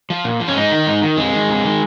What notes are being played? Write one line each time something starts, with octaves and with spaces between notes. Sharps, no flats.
F3
A#2
F3
C#4
G#2 D#4
D#3
G#2
D#3
F2 G#3
D#3
F2
D#3